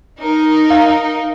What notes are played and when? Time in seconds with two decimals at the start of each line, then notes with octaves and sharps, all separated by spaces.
0.20 D#4 A#4
0.70 F5